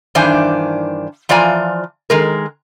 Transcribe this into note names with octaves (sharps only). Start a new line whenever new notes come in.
G2 D#3 E3 D4 C5 G#5
E3 F3 F4 D5 G#5 A#5
D#3 G#3 A#4